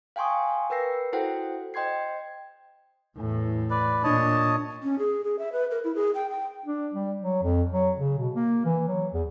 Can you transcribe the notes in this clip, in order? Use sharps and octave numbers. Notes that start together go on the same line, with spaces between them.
F5 G5 G#5 C6 C#6 D#6
A#4 B4 G5 E6 A#6 C7
E4 F#4 A4 C5 F#5 G5
C5 D#5 G5 C6 G#6 C7
E2 A2
B4 D5
A#2 D4 C#5 D#5 A5
C#4
G#4
G#4
E5
B4
A#4
E4
G#4
G5
G5
D4
G3
F#3
F2
F#3
C#3
B2
A#3
E3
F#3
E2